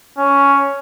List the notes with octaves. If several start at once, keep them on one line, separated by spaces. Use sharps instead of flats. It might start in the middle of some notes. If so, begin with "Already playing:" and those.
C#4